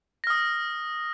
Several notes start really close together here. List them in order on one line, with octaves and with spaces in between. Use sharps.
A#6 F6 D#6